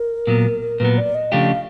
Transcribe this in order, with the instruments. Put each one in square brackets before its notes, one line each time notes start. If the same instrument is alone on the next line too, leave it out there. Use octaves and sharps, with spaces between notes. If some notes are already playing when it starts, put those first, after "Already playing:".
Already playing: [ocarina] A#4
[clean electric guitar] A#2 F#3 B3
[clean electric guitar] A#2 F#3 B3 [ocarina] B4
[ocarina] D5
D#5
[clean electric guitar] C#3 F3 A3 D4 G4 [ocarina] F5